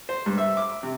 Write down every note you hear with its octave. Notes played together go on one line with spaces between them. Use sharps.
C5
G2
E5
D6
C3